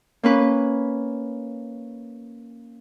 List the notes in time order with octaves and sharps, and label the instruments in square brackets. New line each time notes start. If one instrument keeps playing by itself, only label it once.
[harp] A#3 C#4 B4